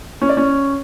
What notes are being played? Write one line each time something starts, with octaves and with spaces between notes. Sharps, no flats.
C#4
D5
C#4